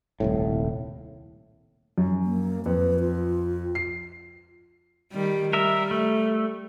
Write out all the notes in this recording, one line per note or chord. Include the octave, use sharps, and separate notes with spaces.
D#1 C2 A2
F#2
A#3
F2 B4
F4
C7
D#3 G3
G3 A#4 E5
A3